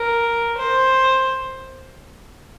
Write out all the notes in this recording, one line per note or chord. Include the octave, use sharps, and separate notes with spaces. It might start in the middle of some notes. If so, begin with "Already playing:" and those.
Already playing: A#4
C5